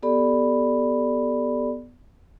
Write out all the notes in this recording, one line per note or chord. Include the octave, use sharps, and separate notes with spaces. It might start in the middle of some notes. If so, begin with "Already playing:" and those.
B3 G4 A4 D5 B5